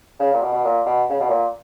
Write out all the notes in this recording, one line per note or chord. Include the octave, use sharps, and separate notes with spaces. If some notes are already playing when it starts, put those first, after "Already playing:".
C#3
A#2
B2
B2
A#2
B2
C#3
B2
A#2